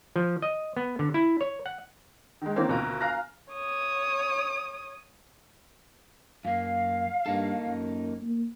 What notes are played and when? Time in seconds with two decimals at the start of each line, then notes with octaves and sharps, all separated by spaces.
0.16 F3
0.42 D#5
0.77 B3
0.99 D3
1.14 E4
1.41 C#5
1.66 F#5
2.42 D#3 G#3
2.56 D#3 E3 A#3 C4 C#4
2.69 D2 B2 F4 A#4 A#5
3.01 F5 G#5 A#5 F6 F#6 A#6
3.52 C#5 D#6
6.45 F#2 A#3 F5
7.26 G2 A#3 D#4 A4
7.66 F#2
8.21 A#3